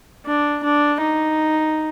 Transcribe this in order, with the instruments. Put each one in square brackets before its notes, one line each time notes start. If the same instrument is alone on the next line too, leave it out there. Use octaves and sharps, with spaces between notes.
[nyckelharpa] D4
D4
D#4